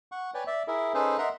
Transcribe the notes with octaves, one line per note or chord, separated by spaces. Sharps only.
F#5 C#6
B4 C#5 D5 G5 G#5
D5 E5
E4 G#4 A#4 E5
C#4 D#4 G#4 A4 B4 C5
A#4 D#5 E5 F#5 A#5 C6